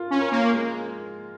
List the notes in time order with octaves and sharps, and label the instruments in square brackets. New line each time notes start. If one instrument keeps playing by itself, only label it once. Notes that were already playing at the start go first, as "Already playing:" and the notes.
Already playing: [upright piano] F4 A#4
[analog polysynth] C#4
[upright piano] A#4
[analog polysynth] A#3
[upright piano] G#3